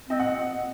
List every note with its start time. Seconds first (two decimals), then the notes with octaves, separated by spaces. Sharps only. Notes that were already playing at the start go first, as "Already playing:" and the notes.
0.09 C4 D#5
0.19 F#5